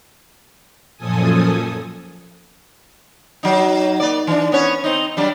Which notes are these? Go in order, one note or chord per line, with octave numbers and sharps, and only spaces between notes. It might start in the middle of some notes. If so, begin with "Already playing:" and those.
F#2 A#2 F3 A4 G#5 D#6
F#3 D#4
A#3 D5
E3 D4
B3 C#4 C#5
C4 D#4
F#3 G3 D4